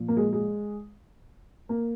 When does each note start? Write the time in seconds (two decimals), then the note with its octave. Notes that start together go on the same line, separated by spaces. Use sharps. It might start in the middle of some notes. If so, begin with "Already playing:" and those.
Already playing: A#2 F3
0.08 A#3
0.17 G#3
0.33 G#3
1.69 A#3